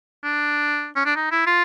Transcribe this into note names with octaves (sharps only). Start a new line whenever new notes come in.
D4
C#4
D4
D#4
E4
F4